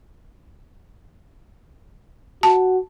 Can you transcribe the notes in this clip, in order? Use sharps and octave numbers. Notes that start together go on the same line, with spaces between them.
F#4 A5